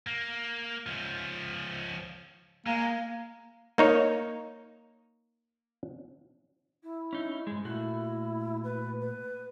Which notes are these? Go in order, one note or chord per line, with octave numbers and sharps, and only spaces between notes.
A#3
C#2 F3
G#3 A#3
A#3 D#4 C#5
E4
C#4 D#4
G#2 G#3
A#2 A3 E4 F#4
B4
B4